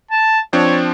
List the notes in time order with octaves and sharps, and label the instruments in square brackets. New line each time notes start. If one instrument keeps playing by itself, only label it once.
[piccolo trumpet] A5
[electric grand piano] F3 C4 D4 [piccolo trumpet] C#5